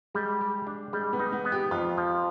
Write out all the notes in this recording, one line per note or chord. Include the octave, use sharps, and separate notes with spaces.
G3 G#3
G4
D4
G3 G#3
B3
D#4
B3
B3
G4
F2 F4
F3